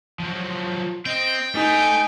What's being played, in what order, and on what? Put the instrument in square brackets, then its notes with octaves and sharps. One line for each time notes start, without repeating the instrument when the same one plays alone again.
[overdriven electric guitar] F3 F#3
[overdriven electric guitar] C4 [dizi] D#5 [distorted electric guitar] G5
[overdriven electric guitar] A3 [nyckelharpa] D#4 [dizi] G#5